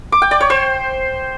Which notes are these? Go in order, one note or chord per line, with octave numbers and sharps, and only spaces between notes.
D6
G5
D5
C#5
C5